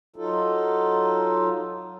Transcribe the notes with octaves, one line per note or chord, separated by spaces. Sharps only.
F#3 D#4 F4 A4